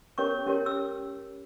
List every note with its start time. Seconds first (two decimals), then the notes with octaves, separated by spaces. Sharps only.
0.18 C#4 G4 A#4 C#5 C#6
0.46 C#4 G4 A#4 C#5
0.66 E6